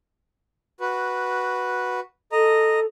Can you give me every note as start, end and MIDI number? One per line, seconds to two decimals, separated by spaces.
0.80 2.00 66
0.80 2.00 71
2.32 2.86 69
2.32 2.80 75
2.32 2.80 82